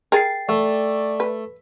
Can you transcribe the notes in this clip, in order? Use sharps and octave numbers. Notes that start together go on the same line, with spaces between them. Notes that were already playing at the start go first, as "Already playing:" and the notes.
G#4 A#4 G5 A6 C7
A3 D5
B4